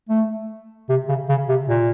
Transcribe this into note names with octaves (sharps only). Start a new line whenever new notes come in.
A3
C3
C#3
C#3
C3
A#2